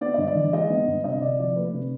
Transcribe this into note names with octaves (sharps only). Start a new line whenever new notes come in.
B3 D5
G2 D#5
D5
E3
G#3 D#5
B3
G2
C3 D#5
C3 D5
F3 D5
A3 B4
C3